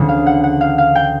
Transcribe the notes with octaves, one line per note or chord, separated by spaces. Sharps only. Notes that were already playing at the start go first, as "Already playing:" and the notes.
Already playing: D2 C#3 E3
F5
F#5
F#5
F5
F5
G5